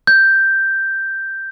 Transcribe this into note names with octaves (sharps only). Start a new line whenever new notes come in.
G6